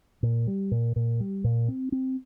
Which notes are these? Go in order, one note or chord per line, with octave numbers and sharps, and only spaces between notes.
A#2
G3
A#2
A#2
G3
A#2
C4
C4